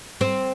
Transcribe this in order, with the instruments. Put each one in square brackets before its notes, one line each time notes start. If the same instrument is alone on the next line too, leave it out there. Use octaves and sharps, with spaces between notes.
[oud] C4